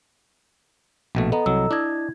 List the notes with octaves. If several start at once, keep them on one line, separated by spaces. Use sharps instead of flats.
A#1 B2 A3
B3 A4 D#5 A#5
C2 F#3 E6
D4 E4 D#5 G#6